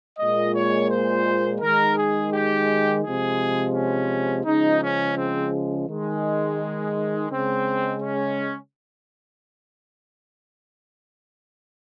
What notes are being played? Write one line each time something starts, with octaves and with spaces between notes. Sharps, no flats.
A#2 G#3 D#5
C#5
C5
D#3 G#3 A#4
G#4
G4
C3 F3 G#3 G#4
C#4
C#3 F3 G#3 D#4
C#4
C4
D#3 G#3
C#3 G#3 C4
C#4